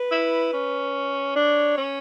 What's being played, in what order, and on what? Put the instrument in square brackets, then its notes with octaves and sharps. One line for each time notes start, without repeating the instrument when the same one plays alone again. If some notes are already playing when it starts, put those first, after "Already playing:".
Already playing: [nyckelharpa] B4
[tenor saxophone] E4
C#4
[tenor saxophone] D4 [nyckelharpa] C#5
[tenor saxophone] C#4